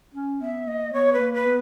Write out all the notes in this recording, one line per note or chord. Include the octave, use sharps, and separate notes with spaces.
C#4
B3 E5
A#3 D#5
B3 C#5
B4
A#3
B4
B3